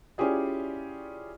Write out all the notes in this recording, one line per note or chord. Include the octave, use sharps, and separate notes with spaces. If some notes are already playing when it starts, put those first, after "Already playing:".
C#4 E4 F4 G4 G#4 D5